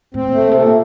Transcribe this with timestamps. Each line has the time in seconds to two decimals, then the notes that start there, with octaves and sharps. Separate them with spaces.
0.14 A2 C4
0.27 A#2
0.34 A3
0.41 A#2
0.51 C3 A3
0.62 A#2